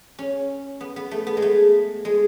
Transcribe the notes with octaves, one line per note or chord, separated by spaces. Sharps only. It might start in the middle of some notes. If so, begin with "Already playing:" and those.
C#4
B3
B3
A3
B3
G#3
A3
G#3